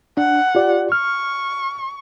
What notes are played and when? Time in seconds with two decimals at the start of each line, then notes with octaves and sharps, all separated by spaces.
0.17 D4 F#5
0.55 F4 G4 D5
0.92 C#6 F6